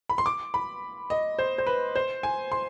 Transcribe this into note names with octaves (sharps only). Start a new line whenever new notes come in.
B5
C6
D6
B5
D#5
C5
C5
B4
C5
G#5
C6